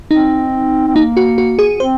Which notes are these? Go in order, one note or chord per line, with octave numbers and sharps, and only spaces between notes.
C4 D#4
C4
A#3 D#4
F#4
F#4
G#4
C4 C5